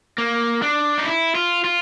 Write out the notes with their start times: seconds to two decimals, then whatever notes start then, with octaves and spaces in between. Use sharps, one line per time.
0.18 A#3
0.62 D4
0.98 D#4
1.05 E4
1.35 F4
1.64 F4